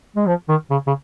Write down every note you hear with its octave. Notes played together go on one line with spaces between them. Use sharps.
G#3
F3
D#3
C#3
C#3